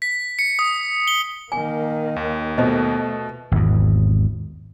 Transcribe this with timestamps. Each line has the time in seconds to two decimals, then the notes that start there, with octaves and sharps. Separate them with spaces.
0.02 B6
0.39 C#7
0.59 D#6
1.08 G7
1.52 D#3 A#3 G#5
2.16 D#2
2.58 B2 A3 F4 C5 D#5
3.52 G#1 E2